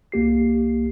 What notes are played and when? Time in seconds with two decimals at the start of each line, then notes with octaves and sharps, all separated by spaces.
0.12 C2 A#3 G4 C7